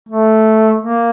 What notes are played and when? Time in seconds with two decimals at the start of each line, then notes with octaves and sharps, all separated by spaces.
0.09 A3
0.80 A#3